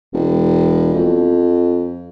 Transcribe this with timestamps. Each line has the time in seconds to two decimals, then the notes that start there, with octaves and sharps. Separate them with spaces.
0.13 E1
0.94 F2